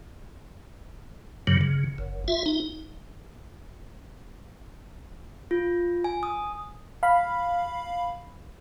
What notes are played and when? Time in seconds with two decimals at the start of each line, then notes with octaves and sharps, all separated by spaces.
1.47 G2 C#3 F#3
1.61 C#3
1.98 F#1
2.28 F4 E5
2.46 D#4
5.51 F4
6.04 G#5
6.23 D#6
7.03 F5 B5